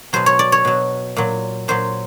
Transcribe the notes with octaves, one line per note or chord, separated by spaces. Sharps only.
B2 F#3 C5
C#5
D5
C#5
B2 F#3
A#2 F#3
A#2 F#3 C5